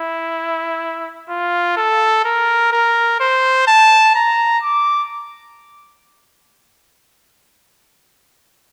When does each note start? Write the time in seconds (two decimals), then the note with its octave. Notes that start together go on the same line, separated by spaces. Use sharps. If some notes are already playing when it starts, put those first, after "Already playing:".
Already playing: E4
1.29 F4
1.77 A4
2.25 A#4
2.72 A#4
3.20 C5
3.67 A5
4.15 A#5
4.63 D6